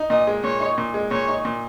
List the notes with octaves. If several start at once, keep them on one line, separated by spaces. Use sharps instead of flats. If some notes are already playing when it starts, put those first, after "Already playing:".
Already playing: D#4
A#2 D#5
G#3
A#2 C#5
D#4
A#2
G#3
A#2 C#5
D#4
A#2